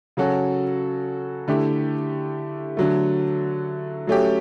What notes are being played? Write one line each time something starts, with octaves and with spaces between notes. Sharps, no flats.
C#3 F#3 C#4 F#4 A4
D3 A3 E4 G4
D3 F#3 A3
F#3 A3 C#4 G4